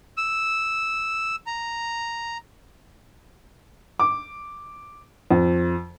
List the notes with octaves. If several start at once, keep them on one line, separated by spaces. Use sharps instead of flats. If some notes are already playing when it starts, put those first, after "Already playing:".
E6
A#5
D6
F2